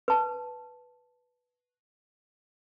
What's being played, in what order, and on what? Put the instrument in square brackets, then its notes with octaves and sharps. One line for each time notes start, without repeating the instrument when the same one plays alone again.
[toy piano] B4 A5